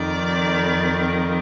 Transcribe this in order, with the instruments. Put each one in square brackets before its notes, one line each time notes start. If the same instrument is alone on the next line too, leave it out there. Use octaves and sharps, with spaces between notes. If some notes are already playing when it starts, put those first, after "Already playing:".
Already playing: [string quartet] F2 D#3 D5